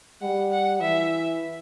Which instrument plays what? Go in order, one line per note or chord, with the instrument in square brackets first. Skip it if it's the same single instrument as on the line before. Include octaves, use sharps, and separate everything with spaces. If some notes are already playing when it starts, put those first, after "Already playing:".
[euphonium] G3 [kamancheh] F#5
[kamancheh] F#5
[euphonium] E3 [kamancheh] E5